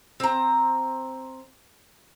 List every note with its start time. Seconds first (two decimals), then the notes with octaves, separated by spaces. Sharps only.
0.20 C4 A#5